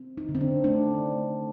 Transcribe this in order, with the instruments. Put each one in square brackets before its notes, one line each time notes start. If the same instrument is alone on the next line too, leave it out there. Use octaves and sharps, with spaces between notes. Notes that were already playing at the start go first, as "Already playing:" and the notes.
Already playing: [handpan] C4
D#4
D3
C4
D4
A3 D4